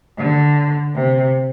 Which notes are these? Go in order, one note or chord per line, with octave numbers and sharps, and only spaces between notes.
D3
C3